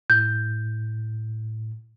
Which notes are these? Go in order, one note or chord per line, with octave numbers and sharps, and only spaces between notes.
A2 G6